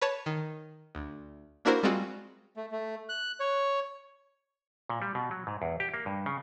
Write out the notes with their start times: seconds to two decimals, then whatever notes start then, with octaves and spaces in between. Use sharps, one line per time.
0.01 B4 C#5 A5
0.26 D#3
0.95 D2
1.65 A#3 D4 E4 F#4 A#4 C5
1.83 G3 G#3 C4 F4 F#4
2.56 A3
2.72 A3
3.09 F#6
3.40 C#5
4.89 A#2
5.02 G3
5.15 B2
5.31 F#3
5.47 G#2
5.62 E2
5.80 G4
5.94 A#3
6.06 G2
6.26 C#3